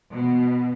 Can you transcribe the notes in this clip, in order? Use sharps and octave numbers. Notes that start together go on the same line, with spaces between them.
B2